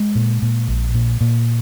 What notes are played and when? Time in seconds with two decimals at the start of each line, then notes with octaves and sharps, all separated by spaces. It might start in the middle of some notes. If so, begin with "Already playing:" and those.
Already playing: G#3
0.15 A#2
0.42 A#2
0.68 A#1
0.94 A#2
1.21 A#2